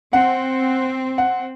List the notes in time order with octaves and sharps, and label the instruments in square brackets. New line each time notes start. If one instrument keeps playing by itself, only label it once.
[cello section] C4 [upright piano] F#5
[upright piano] F#5